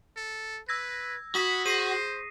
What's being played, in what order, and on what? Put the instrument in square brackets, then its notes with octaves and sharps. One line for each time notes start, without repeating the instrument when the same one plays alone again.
[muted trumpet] A4
[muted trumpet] B4 [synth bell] E6 G#6 A#6
[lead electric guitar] F#4 [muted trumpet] B5 [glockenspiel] D#6 B6
[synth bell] G#4 [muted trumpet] C5 [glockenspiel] A#6 C7 D#7